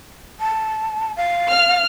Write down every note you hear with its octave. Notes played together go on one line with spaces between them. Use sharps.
A5
F5
F6